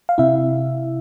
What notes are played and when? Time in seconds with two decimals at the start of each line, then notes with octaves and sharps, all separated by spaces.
0.09 F5
0.18 C3 E4 E5